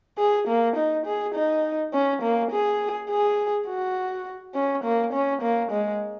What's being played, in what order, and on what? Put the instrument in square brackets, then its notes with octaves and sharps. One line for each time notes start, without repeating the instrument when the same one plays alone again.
[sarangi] G#4
A#3
D#4
G#4
D#4
C#4
A#3
G#4
G#4
F#4
C#4
A#3
C#4
A#3
G#3